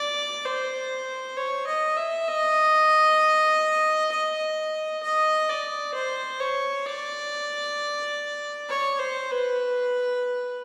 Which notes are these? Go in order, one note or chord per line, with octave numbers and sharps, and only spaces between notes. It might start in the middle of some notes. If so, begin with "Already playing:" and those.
Already playing: D5
C5
C#5
D#5
E5
D#5
D#5
D#5
D5
C5
C#5
D5
C#5
C5
B4